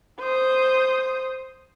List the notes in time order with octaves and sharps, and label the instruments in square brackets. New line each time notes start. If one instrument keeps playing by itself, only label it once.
[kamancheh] C5 D#6